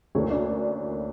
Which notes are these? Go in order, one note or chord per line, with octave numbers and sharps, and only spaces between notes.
D2 D3 A#3 C#4 E4 C#5
D4 D5